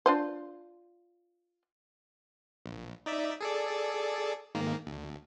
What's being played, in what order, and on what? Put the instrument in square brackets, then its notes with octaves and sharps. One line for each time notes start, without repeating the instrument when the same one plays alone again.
[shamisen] D4 F4 C5
[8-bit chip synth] A#1
D#4 D5 E5
G#4 A4 D5
G#2 D#3 A#3
D2